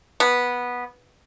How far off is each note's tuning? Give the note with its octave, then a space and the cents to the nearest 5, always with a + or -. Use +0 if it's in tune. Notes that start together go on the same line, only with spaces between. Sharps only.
B3 -10